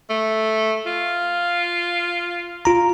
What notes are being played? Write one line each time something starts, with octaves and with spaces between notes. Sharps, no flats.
A3
F4
F4 A#5